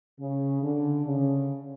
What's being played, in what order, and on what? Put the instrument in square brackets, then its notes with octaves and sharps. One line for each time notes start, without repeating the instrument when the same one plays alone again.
[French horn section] C#3
D3
C#3